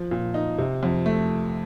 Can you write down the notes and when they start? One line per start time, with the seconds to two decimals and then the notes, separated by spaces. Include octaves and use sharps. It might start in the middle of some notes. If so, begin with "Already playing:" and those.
Already playing: F3
0.11 A#2
0.34 D#4
0.58 C3
0.83 F2
1.06 A3